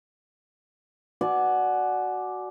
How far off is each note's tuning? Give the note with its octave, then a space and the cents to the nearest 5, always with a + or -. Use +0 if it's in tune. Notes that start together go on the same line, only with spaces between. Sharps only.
F#4 +0 D5 +0 G#5 +40